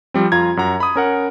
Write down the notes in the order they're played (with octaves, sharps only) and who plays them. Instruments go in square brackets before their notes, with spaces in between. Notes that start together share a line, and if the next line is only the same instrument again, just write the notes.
[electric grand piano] F3 G3 C4
F2 F4 A#5 G#6
F#2 F#5 A#5
B5 D#6
C#4 A#4 F#5